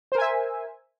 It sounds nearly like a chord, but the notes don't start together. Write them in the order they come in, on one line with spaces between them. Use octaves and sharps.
C5 A#4 G#5 E5